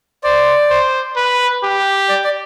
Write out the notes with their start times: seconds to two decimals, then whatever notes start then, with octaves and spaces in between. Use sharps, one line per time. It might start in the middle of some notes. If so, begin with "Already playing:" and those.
0.24 C5 D5
0.70 C5
1.16 B4
1.63 G4
2.09 D5
2.24 D5